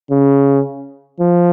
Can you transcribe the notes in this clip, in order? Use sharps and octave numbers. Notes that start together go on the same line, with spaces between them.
C#3
F3